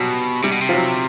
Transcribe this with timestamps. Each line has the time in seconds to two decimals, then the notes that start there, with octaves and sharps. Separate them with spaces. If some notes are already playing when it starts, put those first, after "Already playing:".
Already playing: B2 F#3 G3
0.43 C3 G3
0.52 B2
0.62 C3
0.69 F3
0.74 F#3